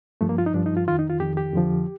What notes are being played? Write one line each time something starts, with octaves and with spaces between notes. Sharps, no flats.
G2 F3 A3
A#3
F4
D#4
G2 F3 D4
D#4
F4
F2 D#3 F4
D#4
F4
F2 D#3 G4
G4
F2 D3 F3